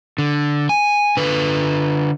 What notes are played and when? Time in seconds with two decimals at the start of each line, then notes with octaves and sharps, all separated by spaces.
0.18 D3
0.69 G#5
1.17 D3 B4